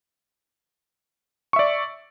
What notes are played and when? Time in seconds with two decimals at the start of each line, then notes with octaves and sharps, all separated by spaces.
1.53 C#6
1.56 E5
1.59 D5